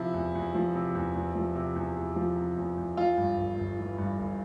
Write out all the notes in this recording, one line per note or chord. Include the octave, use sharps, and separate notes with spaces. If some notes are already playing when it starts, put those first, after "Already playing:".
Already playing: C3 F3 E4
E2
E2
F3
C3
E2
E2
F3
C3
E2
E2
F3
C3
E2
E2
E3 F4
G2
G1
G1
E3
G2
G1